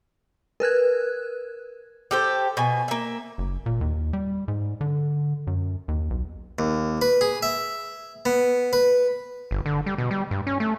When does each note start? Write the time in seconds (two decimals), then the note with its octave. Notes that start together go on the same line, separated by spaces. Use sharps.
0.60 A#4 B4 F#6 G#6
2.11 G4 A4 C5
2.57 B2 G#5
2.88 A#3 E5
3.38 F#1
3.66 A#2
3.81 D#2
4.13 G3
4.48 G#2
4.81 D3
5.47 F#2
5.88 D#2
6.10 B1
6.59 D#2
7.02 B4
7.21 G#4
7.43 E5
8.25 B3
8.73 B4
9.51 G1
9.66 D3
9.86 G3
9.98 B2
10.11 G3
10.31 G2
10.47 C#4
10.60 A3